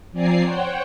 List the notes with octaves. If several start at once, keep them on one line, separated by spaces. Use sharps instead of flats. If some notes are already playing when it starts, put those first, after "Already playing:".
F3 C4 D5 G#5 A#5 C7
C5 C#5 F#5 G5